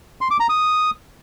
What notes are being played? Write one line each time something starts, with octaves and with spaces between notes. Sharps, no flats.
C6
D6
A#5
D#6